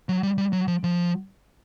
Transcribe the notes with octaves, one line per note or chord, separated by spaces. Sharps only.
F#3
G3
G3
F#3
F3
F3